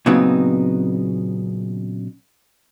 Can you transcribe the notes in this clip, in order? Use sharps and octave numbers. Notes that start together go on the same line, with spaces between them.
A#2 C#3 F#3 B3 C4 D#4